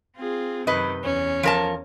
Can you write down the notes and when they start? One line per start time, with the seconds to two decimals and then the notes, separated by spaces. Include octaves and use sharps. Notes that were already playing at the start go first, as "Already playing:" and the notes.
0.17 C4 F4 G#4
0.67 F#2 C3 D#3 B4 D#5
1.03 E2 C#4
1.43 F3 A#4 A5